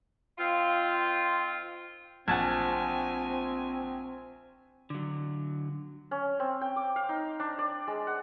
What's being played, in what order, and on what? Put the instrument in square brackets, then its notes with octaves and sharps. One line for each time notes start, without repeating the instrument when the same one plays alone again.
[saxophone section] D#3 C4 F4
[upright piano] A#1 [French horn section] C4 [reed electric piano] F#5 A5 G#6 [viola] G#5
[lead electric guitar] D3 F#3
[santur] C#4
C4
G5
D6
F5
D#4
D4
D5
G#3
F#5